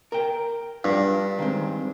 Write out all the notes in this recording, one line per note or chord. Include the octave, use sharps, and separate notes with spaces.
A#4 G5
G2 D4 F4
D#3 G#3 C4